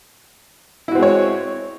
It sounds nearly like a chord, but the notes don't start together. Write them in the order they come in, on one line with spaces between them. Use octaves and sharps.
E4 F#4 C4 G#3 C#5